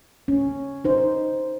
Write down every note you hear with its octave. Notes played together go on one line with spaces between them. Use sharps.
C#4
D#4 C5